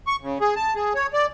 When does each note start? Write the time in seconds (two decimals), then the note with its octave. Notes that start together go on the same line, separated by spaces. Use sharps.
0.07 C#6
0.22 C#3
0.41 G#4
0.56 A5
0.75 G#4
0.95 C#5
1.14 D5